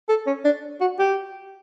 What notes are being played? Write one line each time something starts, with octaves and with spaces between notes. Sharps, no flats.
A4
C#4
D4
F#4
G4